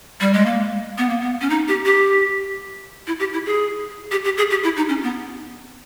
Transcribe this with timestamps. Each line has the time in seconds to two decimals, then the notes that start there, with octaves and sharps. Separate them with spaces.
0.21 G3
0.33 G#3
0.46 A#3
0.98 B3
1.10 A#3
1.21 B3
1.41 C#4
1.50 D#4
1.68 G4
1.85 G4
3.07 E4
3.19 G4
3.33 E4
3.46 G#4
4.11 G4
4.24 G4
4.38 G#4
4.50 G4
4.64 E4
4.77 D#4
4.89 C#4
5.03 B3